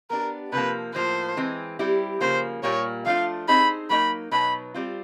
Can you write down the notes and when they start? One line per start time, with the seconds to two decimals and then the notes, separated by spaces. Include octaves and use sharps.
0.10 B3 D4 G4 A#4
0.52 C3 F3 A#3 B4
0.94 A2 F3 A#3 C5
1.37 E3 G#3 C4
1.79 G3 C4 E4 G4
2.20 C#3 F3 A#3 C5
2.63 A#2 G3 A#3 C#5
3.06 F3 A3 D4 F4 F5
3.48 C4 D#4 G#4 C5 B5
3.90 F#3 A#3 D#4 B5
4.31 B2 F#3 B3 D#4 B5
4.74 G3 C4 F4